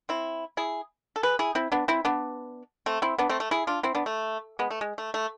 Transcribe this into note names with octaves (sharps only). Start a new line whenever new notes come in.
C4 E4
E4 G#4
A4
G#4 B4
E4 G#4
C4 E4
B3 D4
C4 E4
B3 D4
A3 C4
C4 E4
B3 D4
A3 C4
A3
E4 G#4
D4 F4
C4 E4
B3 D4
A3
G#3 B3
A3
G#3
A3
A3